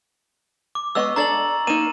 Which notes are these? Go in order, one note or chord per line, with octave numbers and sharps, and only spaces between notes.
D6
G#3 B3 D#5 C#6 E6
D4 A4 D5 A#5 A6 F#7
A#3 D#4 D#7 E7